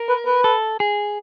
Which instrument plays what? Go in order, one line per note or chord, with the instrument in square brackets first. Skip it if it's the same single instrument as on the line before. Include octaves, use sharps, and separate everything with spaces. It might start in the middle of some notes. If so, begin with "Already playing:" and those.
Already playing: [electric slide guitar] A#4
[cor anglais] B4
B4
[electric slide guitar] A4
G#4